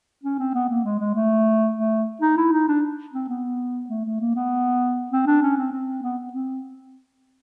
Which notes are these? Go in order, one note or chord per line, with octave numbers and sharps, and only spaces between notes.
C#4
C4
B3
A#3
G#3
G#3
A3
A3
D#4
E4
D#4
D4
C4
B3
A3
A3
A#3
B3
C4
D4
C#4
C4
C4
B3
C4